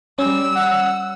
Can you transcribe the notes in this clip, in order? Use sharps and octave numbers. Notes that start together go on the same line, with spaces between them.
G3 C#4 E6
F#5